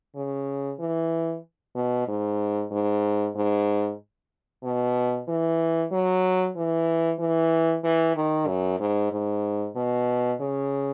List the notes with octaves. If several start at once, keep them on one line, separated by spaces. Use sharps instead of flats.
C#3
E3
B2
G#2
G#2
G#2
B2
E3
F#3
E3
E3
E3
D#3
F#2
G#2
G#2
B2
C#3